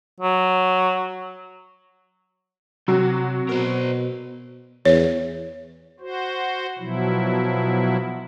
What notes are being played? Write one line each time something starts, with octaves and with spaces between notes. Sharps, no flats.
F#3
C3 F#3 F#4
B2 A#4 C5
E2 C#5
F#4 C5
B2 F3 F#3 E4